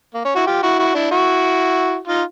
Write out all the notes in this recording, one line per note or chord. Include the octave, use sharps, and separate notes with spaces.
A#3
C#4
E4 F#4
F4 G4
E4 F#4
E4 F#4
D4 E4
E4 F#4
D#4 F4